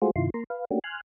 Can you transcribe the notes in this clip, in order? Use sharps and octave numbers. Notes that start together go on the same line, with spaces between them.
G#3 A3 F4 F#4 G#4 C5
G2 C3 D#3 E4 F4 C6
A#3 A#5 C6
B4 F5
A3 A#3 C#4 D4 F#4 G4
G#5 C6 F6 F#6